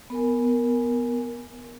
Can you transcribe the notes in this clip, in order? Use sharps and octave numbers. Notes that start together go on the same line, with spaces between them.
B3 A#4 G#5